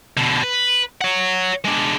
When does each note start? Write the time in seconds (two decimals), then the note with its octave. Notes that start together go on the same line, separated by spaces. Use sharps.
0.17 B2 D3
0.44 B4
1.01 C#5 F#5
1.65 G#3 D4